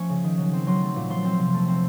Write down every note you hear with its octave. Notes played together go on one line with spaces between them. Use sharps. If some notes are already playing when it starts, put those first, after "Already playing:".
Already playing: F3 A3 C#4 C#6
C#3
D#3
F#3
C4
F#3 C6
A3
A#2
F3 C6
C4
C3
A3
C4